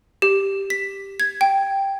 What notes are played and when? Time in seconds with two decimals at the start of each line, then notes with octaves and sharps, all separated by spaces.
0.22 G4
0.70 B6
1.20 G#6
1.41 G5